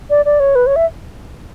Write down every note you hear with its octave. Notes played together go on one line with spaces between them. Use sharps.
D5
D5
C#5
B4
C#5
E5